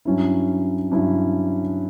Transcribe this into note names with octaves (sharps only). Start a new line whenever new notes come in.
G2 F#3 C#4 E4
G2 F#3 C#4 E4